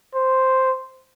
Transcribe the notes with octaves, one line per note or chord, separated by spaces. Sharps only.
C5